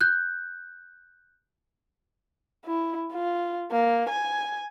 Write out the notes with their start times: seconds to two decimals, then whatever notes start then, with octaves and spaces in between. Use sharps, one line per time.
0.01 F#6 G6
2.65 E4
3.14 F4
3.72 A#3
4.10 G#5